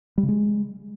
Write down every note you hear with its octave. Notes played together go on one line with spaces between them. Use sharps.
G3
C#3
G#3